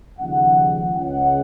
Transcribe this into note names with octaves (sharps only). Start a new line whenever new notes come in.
D#2 C#3 F3 G#3 F#5
C#2 C#3 G#3 F#5